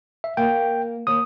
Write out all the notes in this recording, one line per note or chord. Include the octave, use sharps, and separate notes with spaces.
E5
A#3 G5
D#2 D#6